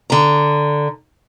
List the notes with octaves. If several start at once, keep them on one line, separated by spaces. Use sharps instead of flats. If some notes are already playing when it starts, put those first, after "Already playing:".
D3 A#5